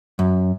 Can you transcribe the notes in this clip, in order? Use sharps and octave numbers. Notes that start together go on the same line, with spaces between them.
F#2